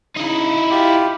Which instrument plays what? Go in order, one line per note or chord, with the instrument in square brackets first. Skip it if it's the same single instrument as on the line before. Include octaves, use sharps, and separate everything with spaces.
[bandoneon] C#3 [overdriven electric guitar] D#4 E4
[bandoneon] F4 G4